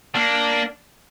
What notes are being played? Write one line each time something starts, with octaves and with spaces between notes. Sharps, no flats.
A#3 D4